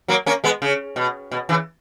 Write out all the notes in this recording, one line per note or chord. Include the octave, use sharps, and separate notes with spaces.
F#3 A#3
A#3 C#4
G#3 B3
C#3
B2
B2
C#3 E3